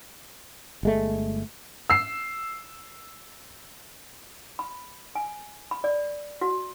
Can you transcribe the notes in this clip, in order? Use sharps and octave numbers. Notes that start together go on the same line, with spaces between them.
G1 G#3 A3
E6 C7
B5
G#5
B5
D5
F#4